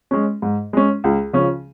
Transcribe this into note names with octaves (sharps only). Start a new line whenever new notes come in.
G#3 C#4
G#2
G#3 C#4
C#2
C#3 F3 C#4